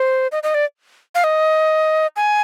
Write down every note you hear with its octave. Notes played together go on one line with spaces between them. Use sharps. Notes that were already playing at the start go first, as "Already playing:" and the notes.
Already playing: C5
D#5
D#5
D5
F5
D#5
G#5